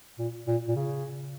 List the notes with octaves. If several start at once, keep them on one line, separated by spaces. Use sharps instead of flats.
A#2
A#2
A#2
C#3